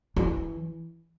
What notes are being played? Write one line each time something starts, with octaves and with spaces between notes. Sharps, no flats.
E3